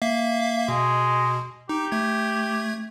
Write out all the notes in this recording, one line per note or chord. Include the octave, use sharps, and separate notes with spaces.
A#3 E5 F5
B2 G#3
D#4 G4
A3 G#6